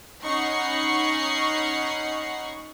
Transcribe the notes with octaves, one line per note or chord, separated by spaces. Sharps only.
C#4 D#4 F#5 B5 C#6 C7